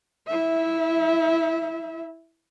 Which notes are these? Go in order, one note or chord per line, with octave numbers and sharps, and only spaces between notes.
E4 E5